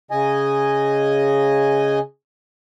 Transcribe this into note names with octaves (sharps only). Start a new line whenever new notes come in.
C#3 D#5 G#5